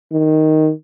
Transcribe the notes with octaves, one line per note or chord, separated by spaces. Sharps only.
D#3